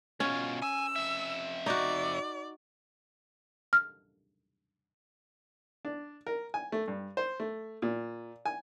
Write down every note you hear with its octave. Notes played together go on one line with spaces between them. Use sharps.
B2 C#4 F4
G#5 E6
F2 E5
D#4 F#4 D5
F6
D4
A#4
G#5
A3
G2
C5
A3
A#2
G#5